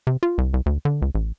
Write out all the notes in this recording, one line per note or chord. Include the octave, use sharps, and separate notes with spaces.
C3
F4
C2
C2
D2
D3
C#2
A1